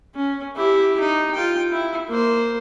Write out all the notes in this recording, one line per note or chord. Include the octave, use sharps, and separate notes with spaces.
C#4
E4 G4
D#4
F4 G5
E4
A#3 C5